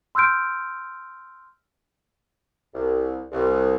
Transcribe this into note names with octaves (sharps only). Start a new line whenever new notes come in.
C6 E6 F6 G6 D7
C2
C2